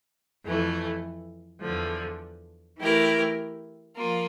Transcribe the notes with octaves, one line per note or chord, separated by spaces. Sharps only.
F2 E3 A3
E2 D3 F3
E3 A3 E4 G4 A#4
F3 A#3 F4